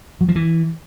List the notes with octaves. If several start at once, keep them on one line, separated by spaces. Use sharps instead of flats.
F#3
F3
E3